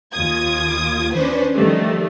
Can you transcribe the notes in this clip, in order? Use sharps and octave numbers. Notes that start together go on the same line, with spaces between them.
D#2 F4 D#6 G#6
C#4 D4 B4 C5
D#3 F3 G3 A3